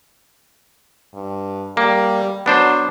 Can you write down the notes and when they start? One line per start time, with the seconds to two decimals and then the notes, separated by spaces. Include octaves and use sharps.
1.14 G2
1.77 G3 A#3
2.46 F#3 B3 D4 C5